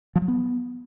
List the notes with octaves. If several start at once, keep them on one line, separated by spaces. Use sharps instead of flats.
F3
F#3
B3